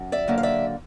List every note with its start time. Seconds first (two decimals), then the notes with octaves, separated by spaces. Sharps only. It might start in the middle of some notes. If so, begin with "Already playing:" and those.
Already playing: F#2
0.12 D5 E5
0.28 D3 F#3 A#3
0.38 F5
0.43 D5 E5